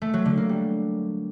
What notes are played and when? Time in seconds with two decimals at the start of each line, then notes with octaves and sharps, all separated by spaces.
0.02 A3
0.13 F#3
0.25 D3
0.37 A#3
0.49 G3